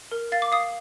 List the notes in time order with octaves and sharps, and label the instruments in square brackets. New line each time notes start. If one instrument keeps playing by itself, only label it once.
[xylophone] A#4
F5 A6
D6
F5 D#6